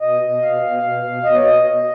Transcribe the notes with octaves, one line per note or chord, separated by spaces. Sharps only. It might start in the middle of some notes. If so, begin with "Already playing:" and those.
B2 D#5
B2
B2 F5
B2
B2
B2
B2 D#5
C#5
B2 D#5
B2